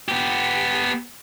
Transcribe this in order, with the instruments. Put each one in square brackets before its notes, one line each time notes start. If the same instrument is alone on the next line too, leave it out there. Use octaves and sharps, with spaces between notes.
[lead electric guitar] B3 G4